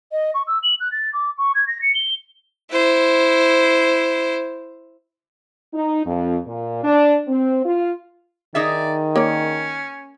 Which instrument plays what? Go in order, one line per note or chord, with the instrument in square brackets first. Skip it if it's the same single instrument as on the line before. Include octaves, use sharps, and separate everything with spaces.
[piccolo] D#5
C#6
E6
F#7
F#6
A6
D6
C#6
G#6
A#6
C#7
G7
[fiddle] E4 C5
[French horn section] D#4
F2
A#2
D4
C4
F4
[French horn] D#3 [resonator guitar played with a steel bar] D#4 G#4 E5 [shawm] D5
[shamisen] A#3 C#5 D5 [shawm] C#4